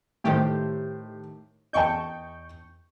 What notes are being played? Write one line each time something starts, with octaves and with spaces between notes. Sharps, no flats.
A2 D#3 A3 G4 C5
E2 D#5 G5 A5 C#6 G6